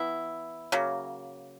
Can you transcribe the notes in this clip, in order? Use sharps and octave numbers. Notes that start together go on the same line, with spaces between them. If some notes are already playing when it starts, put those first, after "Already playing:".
Already playing: E3 B3 E4
C#3 F#3 A#3